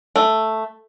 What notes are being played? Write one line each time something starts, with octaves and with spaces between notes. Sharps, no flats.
A3